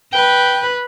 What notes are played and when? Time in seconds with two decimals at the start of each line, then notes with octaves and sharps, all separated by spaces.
0.13 B4 G5